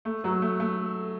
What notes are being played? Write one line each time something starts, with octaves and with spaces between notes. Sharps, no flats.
A3
F#3
A3
A3